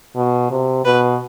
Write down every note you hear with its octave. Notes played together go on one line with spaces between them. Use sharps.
B2
C3
B2 B4